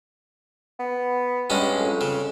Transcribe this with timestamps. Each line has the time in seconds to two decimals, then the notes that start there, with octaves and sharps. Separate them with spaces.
0.79 B3
1.50 G2 G#3 C#4
1.79 F2
2.01 C#3